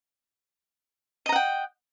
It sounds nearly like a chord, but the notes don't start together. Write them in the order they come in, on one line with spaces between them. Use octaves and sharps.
D#5 A#5 F#5 G5